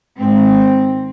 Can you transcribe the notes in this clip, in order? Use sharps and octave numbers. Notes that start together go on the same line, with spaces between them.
G#2 D#3 C4